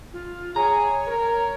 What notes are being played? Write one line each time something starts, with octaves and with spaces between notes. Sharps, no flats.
F4
G#4 C#5 A#5
A#4